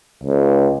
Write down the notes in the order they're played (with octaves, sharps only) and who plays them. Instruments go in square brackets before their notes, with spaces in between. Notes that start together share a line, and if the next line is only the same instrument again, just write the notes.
[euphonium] C#2